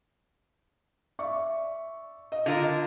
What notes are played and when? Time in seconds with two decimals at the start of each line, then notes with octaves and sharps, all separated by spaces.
1.19 D5 E5 C#6
2.32 D#5
2.46 D3 F4 A#4 D#5